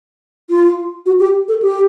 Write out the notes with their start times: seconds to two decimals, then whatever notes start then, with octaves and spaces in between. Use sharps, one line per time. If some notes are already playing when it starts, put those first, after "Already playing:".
0.50 F4
1.06 F#4
1.20 G4
1.48 A4
1.62 G4